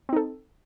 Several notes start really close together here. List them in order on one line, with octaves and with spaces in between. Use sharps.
C4 D#4 A4